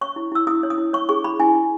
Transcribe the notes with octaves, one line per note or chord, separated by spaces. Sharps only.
C#5 C#6
E4
E4 E6
E4 D#6
C#5
D#6
E4
C#5 C#6
G#4 C#6
E4 B5
E4 G#5
E4